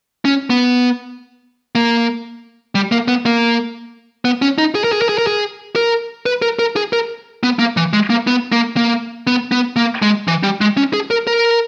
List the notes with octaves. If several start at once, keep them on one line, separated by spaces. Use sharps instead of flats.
C#4
B3
A#3
G3
A#3
B3
A#3
B3
C#4
D#4
G#4
A#4
G#4
A#4
G#4
A#4
G#4
A#4
B4
A#4
A#4
G#4
A#4
B3
A#3
E3
G#3
A#3
B3
A#3
A#3
B3
B3
A#3
G#3
E3
G3
G#3
C#4
G#4
A#4
A#4